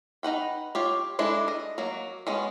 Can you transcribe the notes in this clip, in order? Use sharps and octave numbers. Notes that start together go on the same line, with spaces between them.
D#4 B4 F#5 G5
F4 G4 C#5
G#3 D4 E4 A4
D#5
F#3 A#3
G#3 B3 C#4